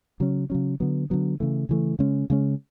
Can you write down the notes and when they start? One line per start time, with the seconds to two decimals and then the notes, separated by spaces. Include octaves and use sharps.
0.20 C#3 F#3 C#4
0.50 C#3 F#3 C#4
0.80 D3 F#3 B3
1.10 D3 F#3 B3
1.40 C#3 E3 A3
1.69 C#3 E3 A3
1.99 C#3 G#3 C#4
2.30 C#3 G#3 C#4